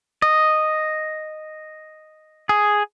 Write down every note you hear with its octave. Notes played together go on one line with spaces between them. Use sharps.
D#5
G#4